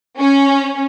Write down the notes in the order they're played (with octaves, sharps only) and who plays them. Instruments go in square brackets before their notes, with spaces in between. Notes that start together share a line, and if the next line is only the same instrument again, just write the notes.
[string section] C#4